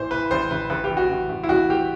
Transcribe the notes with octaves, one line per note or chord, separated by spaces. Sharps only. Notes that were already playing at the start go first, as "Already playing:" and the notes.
Already playing: A1 A2 E3 C5
E3 B4
A1 C5
A1 B4
A1 B4
G4
A1
F#4
A1
A1
E4
A1 F#4
E3 G4